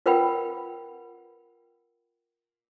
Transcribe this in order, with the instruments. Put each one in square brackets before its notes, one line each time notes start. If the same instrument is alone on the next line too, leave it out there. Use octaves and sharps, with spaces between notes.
[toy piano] F4 A#4 B4 F#5 G5 B5